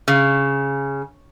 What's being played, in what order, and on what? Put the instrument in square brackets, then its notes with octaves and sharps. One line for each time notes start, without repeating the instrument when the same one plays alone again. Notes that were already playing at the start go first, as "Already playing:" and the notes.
[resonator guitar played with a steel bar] C#3